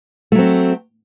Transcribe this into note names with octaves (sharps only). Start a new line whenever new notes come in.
F#3 A3 C4